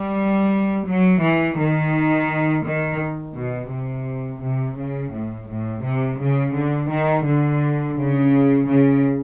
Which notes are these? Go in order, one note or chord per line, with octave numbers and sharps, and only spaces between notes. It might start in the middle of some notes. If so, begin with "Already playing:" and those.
Already playing: G3
F#3
E3
D#3
D#3
B2
C3
C3
C#3
A2
A2
C3
C#3
D3
D#3
D3
C#3
C#3